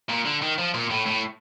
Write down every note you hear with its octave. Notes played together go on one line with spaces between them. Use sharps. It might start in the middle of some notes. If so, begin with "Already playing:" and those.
A#2
D3
D#3
F3
A#2
A2
A2